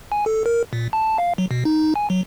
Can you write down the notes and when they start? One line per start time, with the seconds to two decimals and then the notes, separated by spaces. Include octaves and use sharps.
0.12 G#5
0.26 A4
0.46 A#4
0.73 A#2
0.93 A5
1.18 F5
1.38 F#3
1.51 B2
1.65 D#4
1.96 G#5
2.10 F#3